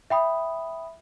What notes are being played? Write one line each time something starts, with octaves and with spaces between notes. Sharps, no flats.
E5 G5 B5 D#6